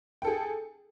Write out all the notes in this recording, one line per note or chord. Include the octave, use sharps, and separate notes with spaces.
G#4 A4 G5